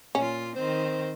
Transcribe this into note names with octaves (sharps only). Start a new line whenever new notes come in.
A#2 C#4 F4
D#3 C4 C5